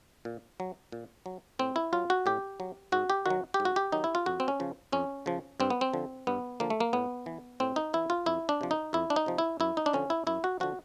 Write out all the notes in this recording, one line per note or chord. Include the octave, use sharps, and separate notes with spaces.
A#2
F#3
A#2
F#3
A2 C4
E4
F#3 F4
F#4
A2 G4
F#3
G#2 F#4
G4
D#3 F#3 F#4
G4
G#2
F#4
G4
D#3 F#3 D#4
E4
F4
F2 F#4
C4
C#4
C#3 F3
F2 C#4
C#3 F3
G2 C4
B3
C4
D3 F3
G2 B3
D3 F3 A#3
A3
A#3
A2 B3
E3
A2 C4
D#4
E3 E4
F4
F2 E4
D4
C3 F3
D#4
F2 E4
D4
D#4
C3 F3
E4
F#2 E4
D#4
D4
D3 F3 C#4
E4
F#2 E4
F#4
D3 F3 F#4